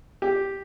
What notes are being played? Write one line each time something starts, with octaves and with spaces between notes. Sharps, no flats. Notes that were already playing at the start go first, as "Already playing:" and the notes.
G4